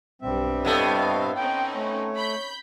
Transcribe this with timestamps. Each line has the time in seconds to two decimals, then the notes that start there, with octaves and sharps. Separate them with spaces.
0.22 B1 G2 G3 C4 E5
0.65 A2 B3 A4 D#5 F5
1.37 C4 C#4 D#4 G5
1.75 A3 C#5
2.16 B5 G6